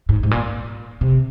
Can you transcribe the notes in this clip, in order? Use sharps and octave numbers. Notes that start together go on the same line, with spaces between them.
G#2
G#2
A#2
C3